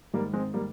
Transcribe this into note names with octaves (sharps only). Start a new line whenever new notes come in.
G#2 D#3 G3 A#3
G#3 C4
G3 A#3